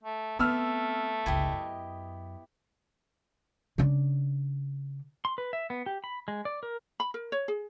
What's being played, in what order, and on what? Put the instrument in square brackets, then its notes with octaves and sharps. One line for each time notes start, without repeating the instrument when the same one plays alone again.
[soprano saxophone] A3
[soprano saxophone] A3 [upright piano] B3 E6 F6 [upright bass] C4
[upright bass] G1 C#2 [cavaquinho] E4 G4 D#5
[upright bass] F#2
C#3 D4
[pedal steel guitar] C6
B4
E5
B3
G4
B5
G#3
D5
A#4
[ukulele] B5
A#4
C#5
G#4